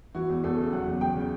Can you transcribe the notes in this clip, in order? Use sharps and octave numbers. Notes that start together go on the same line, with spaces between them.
E3 F#4
E2
E2 A4
C#3
F#3 F#5
E2
E2 G5
C#3